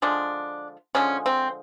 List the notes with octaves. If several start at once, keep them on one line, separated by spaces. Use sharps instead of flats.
D3 F3 G#3 D4
D3 F3 G#3 C#4
C4